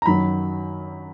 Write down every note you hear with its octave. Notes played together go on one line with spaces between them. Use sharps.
A#5
F#2 D#3 F#3 B5